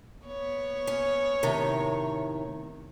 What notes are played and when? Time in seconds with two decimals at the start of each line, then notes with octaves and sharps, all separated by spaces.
0.25 B3 C#5
0.87 C#4
1.43 A2 C3 D#3